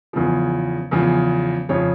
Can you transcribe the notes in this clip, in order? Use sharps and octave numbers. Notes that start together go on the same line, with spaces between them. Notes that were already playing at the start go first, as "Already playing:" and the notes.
E2 C#3 F3
E2 C#3 F3
F2 C#3 F3 C#5